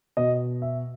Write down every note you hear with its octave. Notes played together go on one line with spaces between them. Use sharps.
B2 D#5
E5